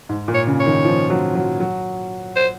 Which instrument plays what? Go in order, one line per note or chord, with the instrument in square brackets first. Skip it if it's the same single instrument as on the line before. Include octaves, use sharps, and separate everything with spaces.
[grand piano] G#2
A#2
[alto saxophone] C#5
[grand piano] C#3
[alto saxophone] C#5
[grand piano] D#3
F3
F#3
F#3
F#3
[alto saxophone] C5